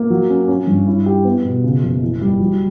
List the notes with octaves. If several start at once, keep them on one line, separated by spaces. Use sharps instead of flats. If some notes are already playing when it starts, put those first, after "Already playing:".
Already playing: A#3
F#3
C#4
C#4
G2
E4
G4
B3
B2
C#3
F#1
E3
G3
F#3